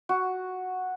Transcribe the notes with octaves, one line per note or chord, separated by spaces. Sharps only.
F#4